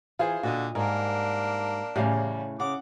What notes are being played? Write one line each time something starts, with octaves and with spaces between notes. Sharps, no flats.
E3 F4 G#4 C5
A#2 D3 F4 F#4 D#5
G#2 G3 A#3 D4 A#4
E2 A2 C#3 G3 F5
C#3 F#5 D6